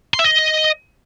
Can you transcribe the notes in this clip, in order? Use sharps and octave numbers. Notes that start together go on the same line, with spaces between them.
C6
E5
D#5